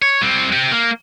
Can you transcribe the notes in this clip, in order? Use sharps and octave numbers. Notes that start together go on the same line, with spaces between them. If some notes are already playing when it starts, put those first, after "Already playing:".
C#5
G3 C4
C4 G4
A#3